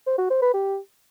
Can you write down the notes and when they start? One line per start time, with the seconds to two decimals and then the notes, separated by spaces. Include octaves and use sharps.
0.06 C5
0.18 F#4
0.30 C5
0.42 B4
0.54 G4